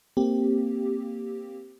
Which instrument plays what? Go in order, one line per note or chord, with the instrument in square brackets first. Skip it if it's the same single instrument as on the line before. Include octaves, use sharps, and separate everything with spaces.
[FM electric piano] A#3 C4 G4